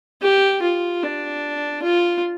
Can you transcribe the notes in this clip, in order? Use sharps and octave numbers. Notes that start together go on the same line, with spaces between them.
G4
F4
D4
F4